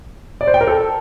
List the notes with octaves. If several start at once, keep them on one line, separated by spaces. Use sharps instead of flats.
D5
C5
G5
A#4
A4